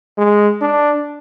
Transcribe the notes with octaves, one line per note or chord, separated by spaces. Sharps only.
G#3
D4